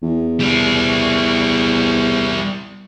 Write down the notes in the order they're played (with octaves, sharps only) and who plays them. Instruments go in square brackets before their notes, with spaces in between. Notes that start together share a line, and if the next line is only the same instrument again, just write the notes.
[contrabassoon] E2
[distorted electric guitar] G3 E4